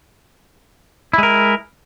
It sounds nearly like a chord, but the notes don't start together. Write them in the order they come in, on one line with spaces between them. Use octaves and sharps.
E4 G#3 A#4